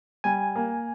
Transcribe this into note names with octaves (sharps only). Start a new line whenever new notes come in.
G3 G#5
A#3